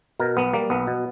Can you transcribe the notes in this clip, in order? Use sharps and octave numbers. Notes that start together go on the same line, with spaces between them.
B2 A#4
B1 B3
G3 A#3
B1 B3
B2